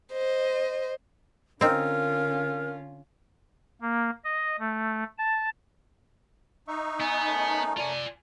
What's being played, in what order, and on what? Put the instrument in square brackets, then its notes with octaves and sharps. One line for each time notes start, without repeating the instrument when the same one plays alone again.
[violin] C5 D#5
[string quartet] D3 C#4 F4 [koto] C4 D#4 [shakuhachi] A#4
[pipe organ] A#3
D#5
A3
A5
[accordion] D#4 [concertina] E5 C#6
[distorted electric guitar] B3 [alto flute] G#5
[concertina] A3 C#4 A#4
[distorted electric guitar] F4 G#5 [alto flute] D5